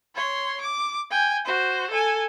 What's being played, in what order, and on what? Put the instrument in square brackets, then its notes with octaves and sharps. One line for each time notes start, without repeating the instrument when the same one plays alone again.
[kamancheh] C#5 C6
D6
G5 G#5
F#4 C5
A4 G#5